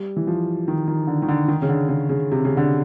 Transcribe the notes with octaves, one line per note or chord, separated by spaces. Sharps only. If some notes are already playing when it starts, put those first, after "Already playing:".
Already playing: G3
E3
F3
D#3
D#3
D3
D#3
D3
D#3
C#3
D3
C#3
C#3
C3
C#3
D3